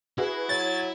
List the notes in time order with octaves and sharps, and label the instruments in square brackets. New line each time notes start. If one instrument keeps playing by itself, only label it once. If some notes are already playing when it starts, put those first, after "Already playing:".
[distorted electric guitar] E4 [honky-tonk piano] F#4 G#4 B4
[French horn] F#3 [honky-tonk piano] C#5 [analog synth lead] A6